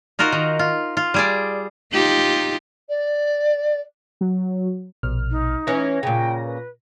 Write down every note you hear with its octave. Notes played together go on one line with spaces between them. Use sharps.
D#4 F4 F#4 A#4
D#3
F4
F4
G3 G#4 D5
D#4 F4 G4
D5
F#3
A#1 B2 F6
D#4
E3 C#4 A#6
A#2 C#3 G5
B4